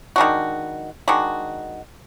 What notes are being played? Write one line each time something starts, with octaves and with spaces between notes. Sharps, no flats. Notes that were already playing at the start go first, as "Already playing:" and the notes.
D#3 G#3 D4 F#4
D#3 G#3 D4 F#4